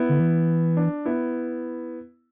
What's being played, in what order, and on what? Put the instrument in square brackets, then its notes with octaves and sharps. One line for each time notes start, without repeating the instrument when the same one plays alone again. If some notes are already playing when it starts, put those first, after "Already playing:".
Already playing: [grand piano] B3 E4
[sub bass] D3
E3
[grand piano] D4
B3 E4